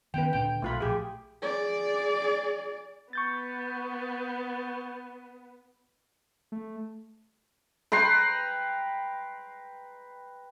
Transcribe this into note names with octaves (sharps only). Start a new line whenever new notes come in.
D#3 B3 C#4 B4 G5
D2 A#2 D3 G5
B1 A3 F4 B5
A#1 G4 G#4
G#4 D5
B3 C#6 G6 A6
A3
B4 G5 A#5 C6